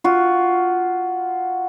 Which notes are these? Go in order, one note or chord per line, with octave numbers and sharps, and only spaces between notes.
F4 F#4